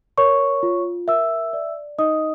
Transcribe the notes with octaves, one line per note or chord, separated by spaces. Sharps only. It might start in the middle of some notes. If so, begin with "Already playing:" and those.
A#4 C#5 C#6
F4
A#4 E5 E6
D5
D#4 D#5 D#6